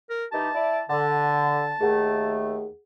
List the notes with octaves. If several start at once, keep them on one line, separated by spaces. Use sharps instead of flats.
A#4
E3 D#4 G4 A5
E4 D5
D3 F#5 A5
D#2 A3 G#4 F#5